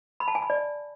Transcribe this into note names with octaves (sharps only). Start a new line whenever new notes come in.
B5
A5
G#5
B5
D5